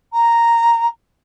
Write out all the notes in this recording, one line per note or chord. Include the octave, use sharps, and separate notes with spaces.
A#5